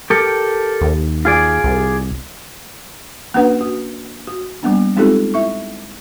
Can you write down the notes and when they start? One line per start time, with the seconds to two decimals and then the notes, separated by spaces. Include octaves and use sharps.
0.10 G4 A4 A#4
0.81 D#2
1.25 F4 G#4 D5
1.64 C2
3.34 A#3 C#4 D4 F#4 B4 F#5
3.61 F#4
4.27 F#4
4.63 G3 A#3 B3 D4
4.96 G#3 C4 D#4 F4 G4 A4
5.34 E4 E5 C#6